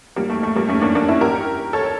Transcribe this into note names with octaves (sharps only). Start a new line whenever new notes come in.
G3 A#3
A3
A3
G3 A#3
A3 C#4
A#3 D4
A#3 D4
C#4 E4
G4 A#4
A4 C#5